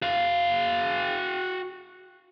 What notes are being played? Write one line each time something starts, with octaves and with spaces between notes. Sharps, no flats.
F#4 F5